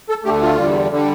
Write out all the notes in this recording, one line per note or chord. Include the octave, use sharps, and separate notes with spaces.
A4
D2 D3 A3 G4
F4
E2 D3 G3
D3 G3